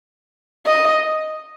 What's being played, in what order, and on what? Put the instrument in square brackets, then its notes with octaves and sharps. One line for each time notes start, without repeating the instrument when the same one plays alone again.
[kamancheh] D#5